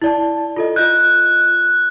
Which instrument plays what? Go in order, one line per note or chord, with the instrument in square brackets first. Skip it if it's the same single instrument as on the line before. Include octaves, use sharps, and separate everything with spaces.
[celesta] E4 D5 A5
F4 A4 D#5
[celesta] F4 D#5 G6 [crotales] F#6